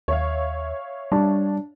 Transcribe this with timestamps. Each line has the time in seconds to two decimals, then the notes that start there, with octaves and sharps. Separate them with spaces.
0.08 D#2 C#5 E5 F5
1.12 G3 D4 A5